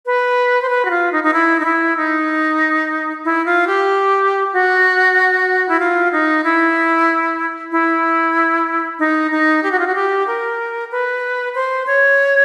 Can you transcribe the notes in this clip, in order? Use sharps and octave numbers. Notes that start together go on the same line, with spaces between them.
B4
C5
B4
F#4
F4
D#4
D#4
E4
D#4
E4
D#4
E4
F4
G4
F#4
E4
F4
D#4
E4
E4
D#4
D#4
G4
F#4
F4
F#4
G4
A#4
B4
C5
C#5